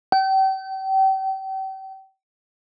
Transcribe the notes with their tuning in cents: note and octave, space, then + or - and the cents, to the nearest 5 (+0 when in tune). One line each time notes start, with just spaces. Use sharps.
G5 -35